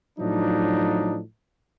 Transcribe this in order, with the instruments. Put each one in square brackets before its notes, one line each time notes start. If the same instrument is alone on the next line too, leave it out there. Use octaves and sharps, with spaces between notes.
[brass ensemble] A2 F3 F#3 D4 D#4